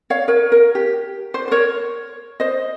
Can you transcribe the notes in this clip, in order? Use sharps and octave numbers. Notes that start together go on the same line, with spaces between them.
C#5 F5
A#4 C#5
A#4
G4
C5
C5
A#4 C#5
C5 D#5